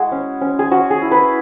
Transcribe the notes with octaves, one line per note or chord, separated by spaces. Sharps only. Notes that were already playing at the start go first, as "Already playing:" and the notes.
Already playing: G#3 E4 F#4 G#4
C#4
C#4
G#4
C#4 F#4
G#4
E4
B4